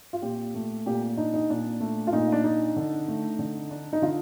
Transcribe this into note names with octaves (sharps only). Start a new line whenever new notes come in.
F4
A#2 G4
A3
A#2 G4
D4 D#4
D#4
A#2 D4
A3
F4
A#2 D#4
D4
D4 D#4
D3
A3
D3
D4
D#4
D3 F4